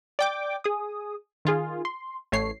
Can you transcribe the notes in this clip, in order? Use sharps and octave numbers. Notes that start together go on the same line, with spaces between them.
D5 G5 D6
G#4 D#6
D#3 F4 G#4
C6
A1 A3 C#5 C7